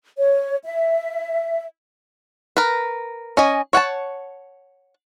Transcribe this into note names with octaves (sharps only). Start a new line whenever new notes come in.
C#5
E5
A#4 B4
C#4 D#5 G#5
C#5 F#5 G#5 A5